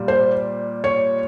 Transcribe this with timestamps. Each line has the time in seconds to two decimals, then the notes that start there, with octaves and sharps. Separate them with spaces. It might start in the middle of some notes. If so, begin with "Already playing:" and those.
Already playing: A#2 G3
0.08 C5
0.84 C#5